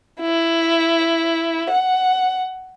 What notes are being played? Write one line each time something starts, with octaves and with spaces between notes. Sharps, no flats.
E4
F#5